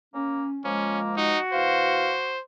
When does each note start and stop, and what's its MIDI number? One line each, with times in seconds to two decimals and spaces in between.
0.14 0.45 58
0.14 0.59 61
0.65 1.36 53
0.65 1.36 56
0.65 1.15 58
0.65 1.00 61
1.17 1.39 63
1.17 2.34 66
1.53 2.13 47
1.53 2.13 52
1.53 2.41 72
1.53 2.13 77